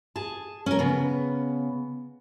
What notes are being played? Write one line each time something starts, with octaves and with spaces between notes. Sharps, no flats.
G#4 A5
C#4 A#4
C#3 B3